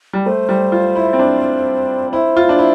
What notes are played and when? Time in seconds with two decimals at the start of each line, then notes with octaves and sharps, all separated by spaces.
0.13 G3
0.26 A3 C5
0.49 G3
0.72 F4
0.96 E4
1.13 C4
1.19 D4
2.12 E4 C5
2.37 F4
2.49 D4
2.59 E4